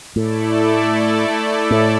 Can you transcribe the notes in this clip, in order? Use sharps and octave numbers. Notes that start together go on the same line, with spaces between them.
A2 A3 E4 A4 D5
A2